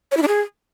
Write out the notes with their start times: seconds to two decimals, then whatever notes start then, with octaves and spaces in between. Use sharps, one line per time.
0.12 C#5
0.17 E4
0.22 D4
0.28 G#4